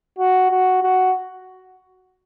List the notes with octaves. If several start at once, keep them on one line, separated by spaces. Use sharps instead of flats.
F#4
F#4
F#4